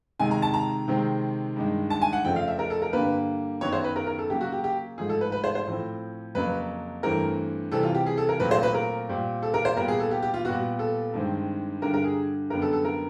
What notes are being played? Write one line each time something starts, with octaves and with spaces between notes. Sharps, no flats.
C3 D#3 G#3 G#5
A#5
A5
A#5
C3 D#3 G#3 C4
G2 D#3 G#3
A5
G#5
F#5
F2 C#3 F3 A3 C4 G5
F5
E5
A#4
A4
A#4
G2 D3 G3 A#3 B4
F#2 D#3 F#3 B3 C#5
C5
B4
A#4
A#4
A4
C#3 F#3 A#3 G4
F#4
G4
G4
G#2 F3 A3 G#4
A4
B4
B4
C5
C5
A2 F3 A3 C4
F2 C#3 F#3 A#3 B4
G2 E3 A3 C4 A#4
C3 E3 G3 C4 A4
F4
G4
G#4
A4
A#4
A#2 F#3 A3 C4 B4
C5
B4
A#4
A#2 G3 C4
A4
A#4
C5
A#2 G3 B3 A#4
G#4
A4
G4
G4
F4
A#2 G3 B3 F#4
A4
G2 D#3 G#3 C4
G2 D3 G3 A#4
A#4
G#4
F#2 D3 G3 B3 A#4
A4
A4
A#4